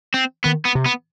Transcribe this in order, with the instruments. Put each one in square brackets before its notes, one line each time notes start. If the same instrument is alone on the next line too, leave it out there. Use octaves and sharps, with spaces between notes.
[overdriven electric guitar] C4
[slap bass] D#3 [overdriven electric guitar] B3
[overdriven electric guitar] B3
[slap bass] C3
[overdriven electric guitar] B3